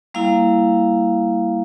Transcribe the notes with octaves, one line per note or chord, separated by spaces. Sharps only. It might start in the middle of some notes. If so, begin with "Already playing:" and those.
G3 A#3 E4 F5